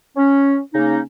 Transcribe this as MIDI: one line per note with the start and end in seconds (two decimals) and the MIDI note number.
0.17 0.59 61
0.74 1.00 49
0.74 1.00 58
0.74 1.00 61
0.74 1.00 63